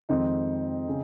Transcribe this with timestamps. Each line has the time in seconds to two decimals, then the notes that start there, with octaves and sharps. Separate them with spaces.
0.09 F2 D#3 G#3 C4 D#4
0.88 C#3